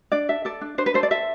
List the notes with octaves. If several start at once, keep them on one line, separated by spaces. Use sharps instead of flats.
D4 D5
A4 E5
A4 D5
D4
D4 C5
B4
A4 C5
D5
A4 E5